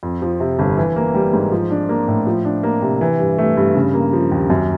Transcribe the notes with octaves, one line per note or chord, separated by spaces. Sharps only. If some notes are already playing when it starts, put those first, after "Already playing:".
F2
F3
C3
G1
E3
A#3
G3
G#2
F3
D4
A#3
A2
F3
D4
A#3
C3
E3
G2
A3
G2
C#3
A#3
F3
D#2
F#2